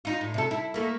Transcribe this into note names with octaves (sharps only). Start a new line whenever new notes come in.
D#4 F4
A2
C3 A4
E4
A3 A#3